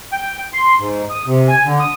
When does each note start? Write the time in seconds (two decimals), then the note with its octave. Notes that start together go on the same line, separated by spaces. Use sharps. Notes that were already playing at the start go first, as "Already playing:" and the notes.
0.12 G5
0.53 C6
0.79 G#2
1.10 D#6
1.26 C3
1.48 G#5
1.65 D3
1.79 D#6